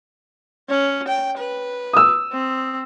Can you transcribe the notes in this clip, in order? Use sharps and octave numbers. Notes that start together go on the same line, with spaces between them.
C#4
G5
B4
D#6 E6
C4